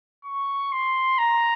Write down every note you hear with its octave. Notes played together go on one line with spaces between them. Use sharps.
C#6
C6
A#5